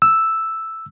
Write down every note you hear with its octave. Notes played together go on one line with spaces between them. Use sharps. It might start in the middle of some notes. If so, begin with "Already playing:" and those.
E6